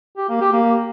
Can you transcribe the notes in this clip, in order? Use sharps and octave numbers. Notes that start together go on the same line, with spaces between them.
G4
A#3
G4
A#3